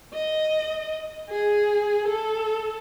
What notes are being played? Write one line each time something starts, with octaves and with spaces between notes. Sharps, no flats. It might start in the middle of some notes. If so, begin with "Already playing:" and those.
D#5
G#4
A4